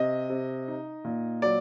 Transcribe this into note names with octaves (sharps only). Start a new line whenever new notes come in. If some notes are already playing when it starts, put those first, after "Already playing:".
Already playing: C3 D#5
C3
D#4
A#2
F#3 D5